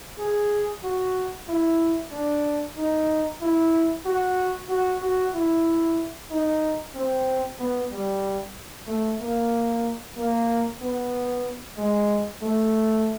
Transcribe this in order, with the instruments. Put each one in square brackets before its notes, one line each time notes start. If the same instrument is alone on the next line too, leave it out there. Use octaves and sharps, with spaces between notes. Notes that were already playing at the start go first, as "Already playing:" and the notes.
[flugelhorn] G#4
F#4
E4
D4
D#4
E4
F#4
F#4
F#4
E4
D#4
C4
B3
G3
A3
A#3
A#3
B3
G#3
A3